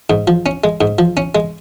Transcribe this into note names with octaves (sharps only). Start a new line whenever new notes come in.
G#2
F3
C#4
G#3
G#2
F3
C#4
G#3